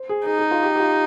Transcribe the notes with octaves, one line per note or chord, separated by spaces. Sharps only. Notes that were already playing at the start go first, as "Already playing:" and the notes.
Already playing: C5
G#4
D#4 G#4
G#4
F4
G4
G4
F4